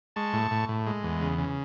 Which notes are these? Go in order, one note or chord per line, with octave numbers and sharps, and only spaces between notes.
G#3 A5 C#6
A2
A2
A2
G#3
E2
C#3
C#3